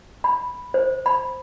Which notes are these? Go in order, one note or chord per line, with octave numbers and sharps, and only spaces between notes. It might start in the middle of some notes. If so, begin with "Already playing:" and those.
B5
C5
B5